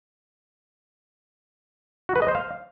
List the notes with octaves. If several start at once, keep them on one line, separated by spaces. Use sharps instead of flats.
F#4
B4
D#5
C5
F5